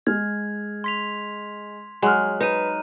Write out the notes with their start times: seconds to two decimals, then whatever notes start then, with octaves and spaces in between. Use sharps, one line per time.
0.07 G#3 F6 G#6
0.84 C6 B6 F7
2.02 F#3 G#3 F6 F#6
2.41 D#4 B4 A#5 D#7